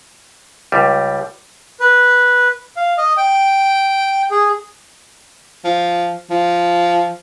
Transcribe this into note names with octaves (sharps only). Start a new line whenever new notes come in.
C#2 G3
B4
F5
D#5
G5
G#4
F3
F3